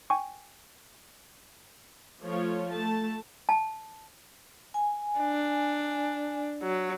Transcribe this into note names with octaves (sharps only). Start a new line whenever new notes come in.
G5 G#5 C#6
F3 A3 F4 C#5
A3 A5
A5
G#5
D4
F#3